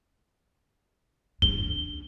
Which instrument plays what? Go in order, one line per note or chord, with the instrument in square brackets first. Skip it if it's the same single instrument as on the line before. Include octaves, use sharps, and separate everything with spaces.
[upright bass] C#4 D4 [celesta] G7